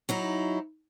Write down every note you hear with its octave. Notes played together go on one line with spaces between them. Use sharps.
F#3 D#4 E4